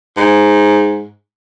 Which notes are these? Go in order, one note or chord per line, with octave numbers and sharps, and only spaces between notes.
G#2